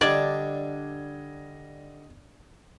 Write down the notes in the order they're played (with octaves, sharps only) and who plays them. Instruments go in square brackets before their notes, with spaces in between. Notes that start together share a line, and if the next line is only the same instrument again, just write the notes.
[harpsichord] D3 G3 [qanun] D4 [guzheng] D5 [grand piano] D#5 G#6